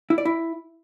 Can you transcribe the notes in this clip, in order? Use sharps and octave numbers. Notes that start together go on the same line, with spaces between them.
E4
D5
E4